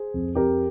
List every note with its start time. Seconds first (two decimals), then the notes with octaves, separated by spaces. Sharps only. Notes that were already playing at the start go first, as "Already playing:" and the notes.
Already playing: G#4 C5
0.14 F2
0.35 F2 G4 A#4